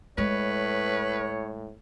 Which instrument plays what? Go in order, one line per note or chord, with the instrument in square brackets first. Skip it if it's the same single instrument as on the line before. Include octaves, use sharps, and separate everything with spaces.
[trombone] A2 [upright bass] G#3 [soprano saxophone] B4 [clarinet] C#5